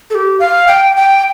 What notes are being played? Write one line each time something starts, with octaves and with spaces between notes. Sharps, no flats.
A4
G4
F5
G5
G5